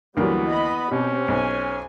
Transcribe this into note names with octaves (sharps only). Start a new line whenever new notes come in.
D2 E3 F#3 G3 A#3 B3 A#4
D#5 B5
B2 C4 C#4 G4
B1 C5 G#5